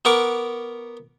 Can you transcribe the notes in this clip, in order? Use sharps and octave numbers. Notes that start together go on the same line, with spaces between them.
B3 A#4 F#5 C#6 D6